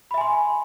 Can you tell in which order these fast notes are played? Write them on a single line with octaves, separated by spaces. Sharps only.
B5 E5 G#5 C6